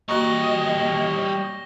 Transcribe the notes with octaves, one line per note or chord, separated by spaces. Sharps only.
G3 A#3 F#4 D#5 C#6 A#6 G7